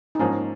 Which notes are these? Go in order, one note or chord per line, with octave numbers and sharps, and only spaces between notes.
D#4
G#2 F3 A#3 C#4